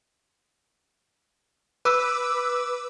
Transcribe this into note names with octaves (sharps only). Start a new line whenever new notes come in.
B4 D6 E6